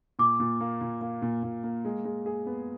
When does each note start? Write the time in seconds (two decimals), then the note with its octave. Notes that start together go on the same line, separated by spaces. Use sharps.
0.19 A#2 D6
0.40 A#2
0.61 A#3
0.81 A#2
1.01 A#3
1.22 A#2
1.43 A#2
1.64 A#3
1.85 G#3
2.05 G#3
2.26 G#4
2.46 B3